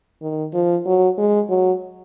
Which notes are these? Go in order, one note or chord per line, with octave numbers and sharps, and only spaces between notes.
D#3
F3
F#3
G#3
F#3